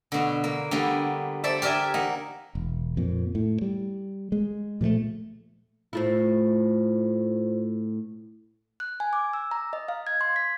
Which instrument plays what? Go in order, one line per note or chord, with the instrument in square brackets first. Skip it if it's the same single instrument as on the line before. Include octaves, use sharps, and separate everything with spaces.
[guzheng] B2 D3
A#3
D3 G3 A#3 B3
A4 C5 D5 E5
G4 A#4 D5 E5 G#5
A#3 D#4 F#5
[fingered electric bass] E1
F2 A#2
A2
G3
G#3
A#2 F3 G3 A3
[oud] A2 A3 E4 [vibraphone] F4 C5
[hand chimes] F#6
G#5
D6
E6
A#5
D#5
F5
G#6
C6
B6